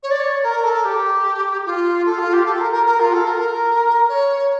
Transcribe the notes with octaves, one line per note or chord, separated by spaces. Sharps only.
C#5
D5
C#5
A#4
A4
G4
F4
A4
F4
G4
A4
A#4
A#4
A#4
F4
A4
A#4
C#5